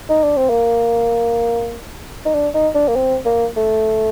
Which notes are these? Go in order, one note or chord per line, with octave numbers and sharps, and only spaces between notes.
D#4
D4
C4
A#3
D#4
D4
D#4
D4
A#3
C4
A#3
A3